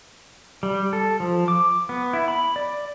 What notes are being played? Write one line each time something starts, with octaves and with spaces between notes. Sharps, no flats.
G3
A4
F3
D6
B3
E4
B5
D5